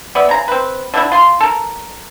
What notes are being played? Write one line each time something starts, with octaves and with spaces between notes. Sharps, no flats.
B3 D5 E5
C#3 A#5
C4 B4
D3 E3 E4
F4 C6
A4 A#4